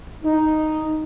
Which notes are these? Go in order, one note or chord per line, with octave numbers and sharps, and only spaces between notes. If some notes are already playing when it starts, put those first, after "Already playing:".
D#4